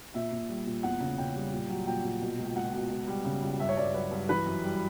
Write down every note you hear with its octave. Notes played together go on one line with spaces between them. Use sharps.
A#2 E5
A#2
G3
A#2
E2 F#5
C#3
C#3 G5
G3
A#2
F#3
A#2 G5
A#2
B2
C#2
C#2 F#5
B2
C#2
G3
C#3
C#2
G2 E5
C#5
G2 D5
F#3 B4
G2
E3 B4
F#2
G3